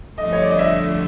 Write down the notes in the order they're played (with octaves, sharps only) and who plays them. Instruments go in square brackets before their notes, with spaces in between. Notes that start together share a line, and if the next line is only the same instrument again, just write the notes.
[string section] G1 F2 D3 F3 A3 [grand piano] D#5
[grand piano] C#5
D5
D#5
E5